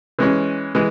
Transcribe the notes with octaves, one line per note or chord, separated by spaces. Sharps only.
E3 G#3 C#4
E3 G#3